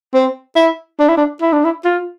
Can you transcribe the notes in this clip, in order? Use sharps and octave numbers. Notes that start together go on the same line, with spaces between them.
C4
E4
D4
E4
D4
E4
D4
E4
F4